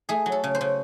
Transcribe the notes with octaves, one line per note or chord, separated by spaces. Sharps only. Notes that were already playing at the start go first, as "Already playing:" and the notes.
A3 G#4
F#3
A4
C#3
C5
C#3